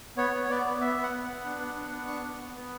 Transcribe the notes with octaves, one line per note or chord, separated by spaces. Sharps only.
B3 C#5
B3
B3 D5
B3
B3 E5
B3
F#5
B3
F#5
B3
D4
B3
D4
B3
D4 C#6
B3
B3
B3